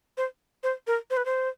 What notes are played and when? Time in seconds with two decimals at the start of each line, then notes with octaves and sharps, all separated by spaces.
0.17 C5
0.63 C5
0.87 A#4
1.10 C5
1.17 B4
1.25 C5